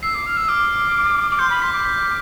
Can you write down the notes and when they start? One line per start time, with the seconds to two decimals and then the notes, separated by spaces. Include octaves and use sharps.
0.03 E6 C7
0.14 D6
0.26 F6
0.37 E6
0.49 D6 F6
1.30 D6
1.39 C6 G6
1.50 B5
1.62 C6 B6
1.73 D6
1.85 B6